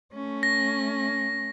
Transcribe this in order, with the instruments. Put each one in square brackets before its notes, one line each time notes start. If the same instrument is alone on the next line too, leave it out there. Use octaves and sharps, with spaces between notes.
[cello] A3 C#4
[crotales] A#6